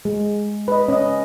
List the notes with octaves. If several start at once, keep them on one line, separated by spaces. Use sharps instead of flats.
G#3
B4 D#5
C#4 D#5